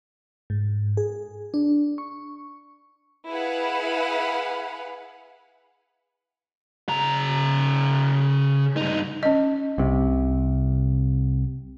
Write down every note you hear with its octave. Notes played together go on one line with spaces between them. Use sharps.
G#2
G#4
D4
C#6
E4 G#4 B4 F5 F#5 B5
C#3 A#5
G2 D#4
C#4 D#5
C2 C3